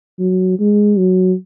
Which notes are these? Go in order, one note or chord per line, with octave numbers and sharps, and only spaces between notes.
F#3
G#3
F#3